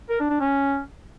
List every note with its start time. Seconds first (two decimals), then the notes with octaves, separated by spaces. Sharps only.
0.10 A#4
0.20 D4
0.30 D4
0.40 C#4